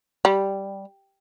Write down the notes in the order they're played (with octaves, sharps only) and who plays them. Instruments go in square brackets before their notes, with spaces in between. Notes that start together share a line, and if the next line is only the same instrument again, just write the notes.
[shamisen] G3